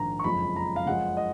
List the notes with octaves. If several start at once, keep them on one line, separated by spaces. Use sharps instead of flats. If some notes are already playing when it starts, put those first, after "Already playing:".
Already playing: A#1 G#2 D#3 A#5
C#6
F#1 F2 F3 G#3 B5
A#5
F5
F#2 F3 G#3 C#4 F#5
D#5